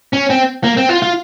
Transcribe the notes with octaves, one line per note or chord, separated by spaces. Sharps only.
C#4
C4
A#3
C4
F4
F4